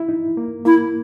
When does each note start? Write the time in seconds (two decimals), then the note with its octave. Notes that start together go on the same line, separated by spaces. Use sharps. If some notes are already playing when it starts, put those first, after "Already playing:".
Already playing: E4
0.09 D#4
0.37 A#3
0.65 A#3 E4